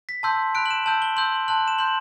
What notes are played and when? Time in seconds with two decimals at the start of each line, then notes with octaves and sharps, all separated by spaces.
0.09 B6
0.23 A5 C6 E6 G6
0.55 B5 F#6 D7
0.66 F#7
0.71 E7
0.86 A5 E6 G6 F#7
1.02 G7
1.16 C6 E6 G6 F#7
1.48 A5 C6 F#6 F#7
1.68 E7
1.78 C6 G6 F#7